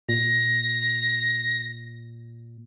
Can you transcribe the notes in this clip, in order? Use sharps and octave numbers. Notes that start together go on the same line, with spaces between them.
A#2 A#6